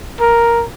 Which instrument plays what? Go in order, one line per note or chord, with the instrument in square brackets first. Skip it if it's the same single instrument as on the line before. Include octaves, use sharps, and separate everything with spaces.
[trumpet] A#4